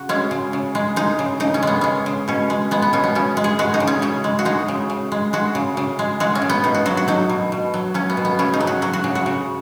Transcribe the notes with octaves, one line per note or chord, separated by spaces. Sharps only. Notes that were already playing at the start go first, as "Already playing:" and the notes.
Already playing: C#3 F#4
G#3 C#4
C#3
C#3
G#3
G#3 D#4
C#3
C#3 D#4
C#4
G#3 B3
G#3 C#4
C#3
B2 C#4
G#3
G#3 B3
B3
B2 C#4
B3
C#3 C#4
G#3
G#4
G#3 F#4
D#4
C#3
C#4
C#3 C#4
G#3
F#4
G#3 D#4
C#3
C#3
G#3
G#3 F#4
C#3
C#3
G#3
G#3 F#4
C#4
C#3
B3
B2 D#4
F#4
F#3 F#4
F#4
F#3 D#4
B2
B2
F#3
F#3 C#4
B3
B2
B3
C#3 C#4
D#4
F#3
F#4
F#3 F#4
F#4
C#3
F#4
C#3